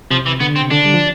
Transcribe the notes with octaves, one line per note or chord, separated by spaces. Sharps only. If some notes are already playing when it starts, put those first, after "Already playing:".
C3 F3
E3
D3 B3
C4
C3
D3 D4
G3
F3